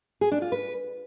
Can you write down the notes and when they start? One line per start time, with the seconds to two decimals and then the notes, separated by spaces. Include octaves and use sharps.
0.21 G#4
0.32 D4
0.42 F4
0.52 B4